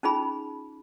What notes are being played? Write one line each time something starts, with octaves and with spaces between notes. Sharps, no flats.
C#4 D#4 F4 G#4 B5